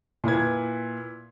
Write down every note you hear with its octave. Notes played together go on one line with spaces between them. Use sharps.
A#2 E4 B4 G#6